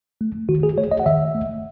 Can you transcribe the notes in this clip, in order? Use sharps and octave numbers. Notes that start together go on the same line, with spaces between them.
A3
D#3 F#4
G#4
A3 C#5
D#5
F#5
D#3 E5
A3